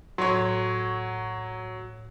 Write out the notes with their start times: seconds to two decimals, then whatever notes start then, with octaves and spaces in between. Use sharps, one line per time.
0.18 A2 F#3 C#5 C6